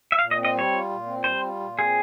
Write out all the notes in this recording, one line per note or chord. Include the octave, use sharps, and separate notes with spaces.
E5
A#2 F5
D#5
C4
D#5
G3
C#5
F4
A#2
C4
G3 C5
F4
A#2
C4 G#4